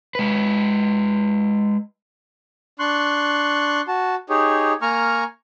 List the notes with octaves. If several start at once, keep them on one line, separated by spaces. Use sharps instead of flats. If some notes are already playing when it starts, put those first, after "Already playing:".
G#3 B4
D4 C6 C#6 F#6
F#4 A5
D#4 G4 G#4 C#5
A#3 G#5 A#5 C#6 F6